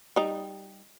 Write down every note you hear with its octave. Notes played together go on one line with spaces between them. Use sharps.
G3 D#4